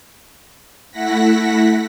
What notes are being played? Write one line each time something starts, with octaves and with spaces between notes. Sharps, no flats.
A3 E4 F#5 A#6 B6